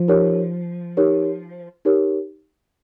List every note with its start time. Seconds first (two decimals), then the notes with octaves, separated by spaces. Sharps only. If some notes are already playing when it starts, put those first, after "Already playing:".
Already playing: F3
0.08 D#4 G4 A#4 C#5
0.97 D#4 G4 A#4 C#5
1.85 D#4 G4 A#4 C#5